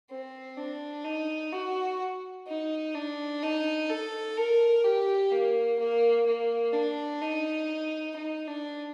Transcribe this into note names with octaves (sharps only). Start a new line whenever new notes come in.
C4
D4
D#4
F#4
D#4
D4
D#4
A4
A#4
G4
A#3
A#3
A#3
D4
D#4
D#4
D4